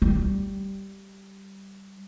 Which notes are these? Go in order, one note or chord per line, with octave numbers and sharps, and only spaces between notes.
G3